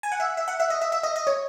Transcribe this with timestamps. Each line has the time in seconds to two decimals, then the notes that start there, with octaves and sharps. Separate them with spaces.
0.03 G#5
0.12 F#5
0.20 E5
0.37 E5
0.48 F#5
0.60 E5
0.70 D#5
0.82 E5
0.92 E5
1.03 D#5
1.16 D#5
1.27 C#5